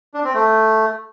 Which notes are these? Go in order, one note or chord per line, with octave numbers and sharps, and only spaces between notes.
D4
C4
A3